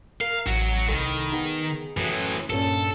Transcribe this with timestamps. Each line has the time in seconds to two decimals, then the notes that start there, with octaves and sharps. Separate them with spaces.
0.21 A#4 F5
0.47 A1 F#3 F#4
0.88 C2 D#3 A4 B5
1.32 B3 D#4 G#4
1.97 F#2 A2 E3 D#6 F#6
2.50 G2 A#2 C#4 A4